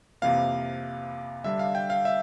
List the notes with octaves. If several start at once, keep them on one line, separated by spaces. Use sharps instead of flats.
F2 C3 E3 A#3 F5
D3 G3 D4 E5
F5
G5
F5
E5